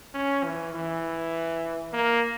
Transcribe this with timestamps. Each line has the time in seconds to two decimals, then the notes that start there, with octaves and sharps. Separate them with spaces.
0.14 C#4
0.44 E3
0.74 E3
1.93 A#3